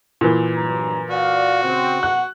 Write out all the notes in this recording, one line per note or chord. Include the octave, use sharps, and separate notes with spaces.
A#2 E3
G2 F#3 A#5
F#4 D5 F5
C#3 C4
B2 F#5 F#6